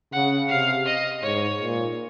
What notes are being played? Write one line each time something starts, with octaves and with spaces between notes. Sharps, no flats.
C#3 F#5
C3 F5
D#5
G#2 C#5
A#2